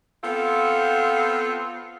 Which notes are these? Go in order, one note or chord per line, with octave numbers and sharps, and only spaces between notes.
B3 C4 F4 A4